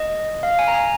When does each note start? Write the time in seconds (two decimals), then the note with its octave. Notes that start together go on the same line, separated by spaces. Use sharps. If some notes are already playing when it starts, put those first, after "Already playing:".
Already playing: D#5
0.43 F5
0.59 G#5
0.68 A#5
0.74 G#5